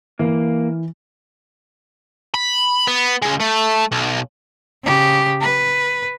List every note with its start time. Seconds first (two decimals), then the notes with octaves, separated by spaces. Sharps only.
0.19 E3 A#3
2.35 B5
2.87 B3
3.22 C#3 G#3
3.40 A3
3.92 B1
4.84 C#3 G4
5.41 B4